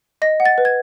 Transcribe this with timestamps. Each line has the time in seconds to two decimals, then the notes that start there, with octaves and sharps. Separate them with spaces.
0.22 D#5 A#6
0.40 F#5
0.45 A6
0.58 B4
0.65 G#6